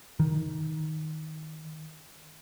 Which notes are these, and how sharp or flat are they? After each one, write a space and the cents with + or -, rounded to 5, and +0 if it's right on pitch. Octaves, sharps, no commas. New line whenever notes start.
D#3 +10